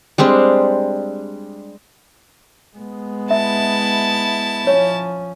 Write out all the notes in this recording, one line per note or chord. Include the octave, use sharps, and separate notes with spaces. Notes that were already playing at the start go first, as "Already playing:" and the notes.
G3 G#3 C4 D4
G#3 B3
E4 E5 A5
F3 C#4 C#5